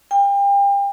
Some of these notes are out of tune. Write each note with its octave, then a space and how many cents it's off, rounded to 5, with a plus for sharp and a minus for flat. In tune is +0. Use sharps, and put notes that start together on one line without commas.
G5 +35